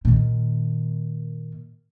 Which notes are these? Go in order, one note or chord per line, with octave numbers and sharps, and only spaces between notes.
A#2 D#3